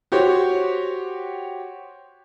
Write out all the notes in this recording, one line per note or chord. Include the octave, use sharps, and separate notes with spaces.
F#4 G4 C5 C#5